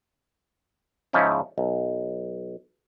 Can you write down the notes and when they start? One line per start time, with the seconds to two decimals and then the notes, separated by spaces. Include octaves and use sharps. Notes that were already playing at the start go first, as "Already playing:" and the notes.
1.13 G#2 C#3 F3 C#4 D#4 E4
1.58 B1